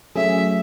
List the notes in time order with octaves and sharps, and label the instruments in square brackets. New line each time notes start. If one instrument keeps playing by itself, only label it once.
[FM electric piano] F#3 A3 C#4 G#4 [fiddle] E5